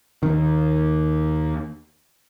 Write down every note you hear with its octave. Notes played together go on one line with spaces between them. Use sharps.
D#2 D#3